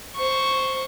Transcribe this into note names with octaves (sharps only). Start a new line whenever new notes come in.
C5 C#6